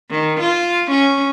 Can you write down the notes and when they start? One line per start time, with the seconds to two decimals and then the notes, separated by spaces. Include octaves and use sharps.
0.10 D#3
0.40 F4
0.91 C#4